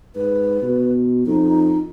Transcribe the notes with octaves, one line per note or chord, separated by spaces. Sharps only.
G#2 B4
B2
F2 D#4